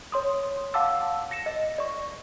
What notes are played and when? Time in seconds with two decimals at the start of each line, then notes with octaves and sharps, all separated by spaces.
0.12 C#5 C6 D#6
0.74 F5 F#5 A5 D6 E6
1.31 A#6 C#7 E7
1.46 D#5
1.78 D5 C#6